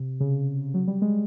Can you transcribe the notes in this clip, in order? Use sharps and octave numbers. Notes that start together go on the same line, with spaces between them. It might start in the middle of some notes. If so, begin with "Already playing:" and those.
Already playing: C3
C#3
F#3
G3
G#3